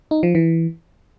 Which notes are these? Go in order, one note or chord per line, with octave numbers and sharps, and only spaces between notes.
D#4
F3
E3